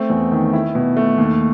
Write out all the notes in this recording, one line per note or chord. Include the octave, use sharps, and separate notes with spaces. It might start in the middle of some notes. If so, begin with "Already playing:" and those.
Already playing: A3 C4
E2
D#3
E4
B2
A3
D#2